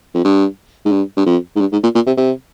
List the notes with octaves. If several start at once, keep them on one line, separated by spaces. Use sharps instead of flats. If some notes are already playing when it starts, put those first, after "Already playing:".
F2
G2
G#2
G2
G2
F2
G#2
G2
G#2
A#2
A#2
C3
C3